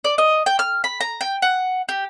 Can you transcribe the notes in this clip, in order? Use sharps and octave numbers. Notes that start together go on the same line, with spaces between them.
D5
D#5
G5
F6
B5
A#5
G5
F#5
G4